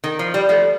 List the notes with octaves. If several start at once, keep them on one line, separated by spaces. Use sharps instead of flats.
D#3
F3
G3
F3 A3